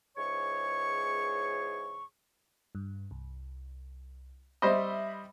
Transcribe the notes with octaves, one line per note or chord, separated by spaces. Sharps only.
C#2 G#2 E3 G#4 C#5 C#6
G2
C2
G3 C5 D#5 E5 B5